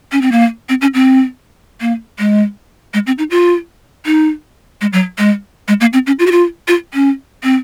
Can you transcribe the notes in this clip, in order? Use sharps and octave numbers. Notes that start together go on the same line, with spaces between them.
C#4
C4
A#3
C4
C#4
C4
A#3
G#3
G#3
C4
D#4
F4
D#4
G#3
F#3
G#3
G#3
A#3
C4
C#4
F4
F#4
F4
F4
C#4
C4